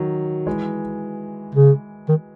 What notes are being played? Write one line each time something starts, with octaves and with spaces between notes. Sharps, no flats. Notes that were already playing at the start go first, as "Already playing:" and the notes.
Already playing: D#3 F#3
E3 G#3
C#3
D#3